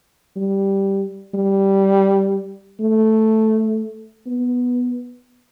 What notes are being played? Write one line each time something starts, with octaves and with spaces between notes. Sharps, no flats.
G3
G3
A3
B3